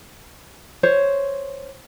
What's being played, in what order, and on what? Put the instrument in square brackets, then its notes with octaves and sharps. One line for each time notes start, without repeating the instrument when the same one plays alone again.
[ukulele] C5 C#5